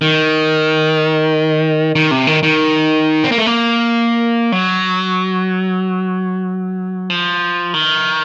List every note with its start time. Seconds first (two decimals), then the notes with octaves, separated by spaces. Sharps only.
0.01 D#3
1.96 D#3
2.11 C3
2.27 D#3
2.43 D#3
3.24 C4
3.32 A#3
3.38 A3
3.46 A#3
4.52 F#3
7.10 F3
7.74 D#3